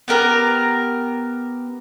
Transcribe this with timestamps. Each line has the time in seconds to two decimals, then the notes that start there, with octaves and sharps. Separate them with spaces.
0.08 B3 G4 A#4 A#5